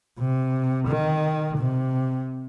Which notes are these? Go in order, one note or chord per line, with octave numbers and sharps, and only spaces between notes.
C3
D#3
C3